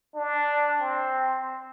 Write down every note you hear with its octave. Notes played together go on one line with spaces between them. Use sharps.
D4
C4